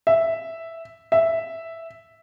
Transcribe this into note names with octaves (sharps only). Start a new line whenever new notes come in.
E5
E5